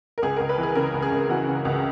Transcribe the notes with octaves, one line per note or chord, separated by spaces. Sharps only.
A#4
C#2 G#4
C#2 A#4
B4
E3
G#4
C#3 A#4
C#2
G#4
C#2
E3 F#4
C#3
C#2